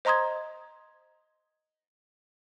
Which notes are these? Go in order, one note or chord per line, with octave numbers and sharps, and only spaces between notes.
C5 D#5 A#5 C6 D#6 G#6